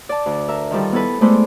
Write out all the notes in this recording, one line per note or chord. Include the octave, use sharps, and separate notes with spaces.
D5 A5
D2
A#4 E5
D#3 F3 G3 A4
B3 E4 A4 B4
G#3 A3 B3 E4 C5 D5